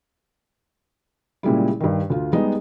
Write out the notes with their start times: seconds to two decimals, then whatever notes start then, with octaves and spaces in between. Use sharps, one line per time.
1.43 A#2 C#3 G3 G#3 E4
1.80 G2 D#3
2.10 D2 F4
2.33 G3 G#3 B3 D#4 D#5